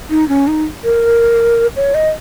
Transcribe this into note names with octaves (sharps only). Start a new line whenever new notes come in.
D#4
C#4
D#4
A#4
C#5
D#5